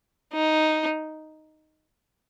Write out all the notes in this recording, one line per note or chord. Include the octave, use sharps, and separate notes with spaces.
D#4